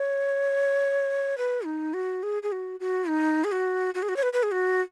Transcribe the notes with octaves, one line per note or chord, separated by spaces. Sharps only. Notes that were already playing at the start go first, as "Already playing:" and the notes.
Already playing: C#5
B4
D#4
F#4
G#4
G#4
F#4
F#4
D#4
G#4
F#4
F#4
G#4
F#4
C#5
B4
B4
G#4
F#4